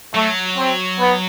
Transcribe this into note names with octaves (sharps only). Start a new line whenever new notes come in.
F#3 A3
C4
B3